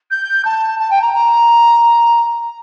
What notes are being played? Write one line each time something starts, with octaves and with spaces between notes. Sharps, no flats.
G6
A5
A5
G5
A#5
A#5